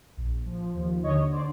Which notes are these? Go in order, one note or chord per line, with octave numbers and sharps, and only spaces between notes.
A#1
F3
D#2
D3 C#5 D#5
C5 D5